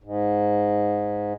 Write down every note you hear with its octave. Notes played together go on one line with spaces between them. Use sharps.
G#2